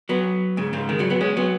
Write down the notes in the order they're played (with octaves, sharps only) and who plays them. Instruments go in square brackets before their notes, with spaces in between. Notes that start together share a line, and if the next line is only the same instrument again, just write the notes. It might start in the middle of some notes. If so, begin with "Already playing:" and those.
[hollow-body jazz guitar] F#3 B3
G#2 C#3
G#2 C#3
D#3 G#3
C#3 F#3
F#3 B3
G#3 C#4
F#3 B3